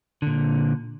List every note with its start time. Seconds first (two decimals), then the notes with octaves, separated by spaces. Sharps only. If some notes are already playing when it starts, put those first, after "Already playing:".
0.22 A#2 D3